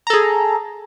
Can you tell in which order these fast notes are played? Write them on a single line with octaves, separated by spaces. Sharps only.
A#5 A4 G#4